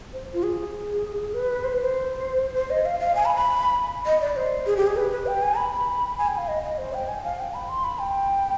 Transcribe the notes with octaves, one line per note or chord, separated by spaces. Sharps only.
C5
F4
G#4
B4
C5
C5
C5
D#5
F5
F5
G#5
B5
B5
D#5
D5
C5
G#4
G4
G#4
B4
B4
G5
G#5
B5
G#5
G5
F5
D#5
D#5
C5
G5
G#5
F5
G5
B5
C6
B5
G5